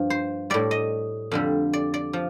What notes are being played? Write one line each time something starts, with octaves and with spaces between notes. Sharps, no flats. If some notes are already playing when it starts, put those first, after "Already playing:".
Already playing: G2 F3
C5
A2 G3 D5
D#5
F2 D3 G3
D5
D5
F3